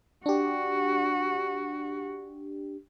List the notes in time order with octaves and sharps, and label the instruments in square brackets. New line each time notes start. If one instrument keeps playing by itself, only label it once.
[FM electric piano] D4 G4 [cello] F#4